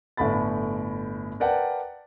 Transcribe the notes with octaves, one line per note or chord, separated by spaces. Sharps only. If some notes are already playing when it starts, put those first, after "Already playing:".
G1 A2 A4 B5 A6
A#4 B4 D5 F#5 G5 A5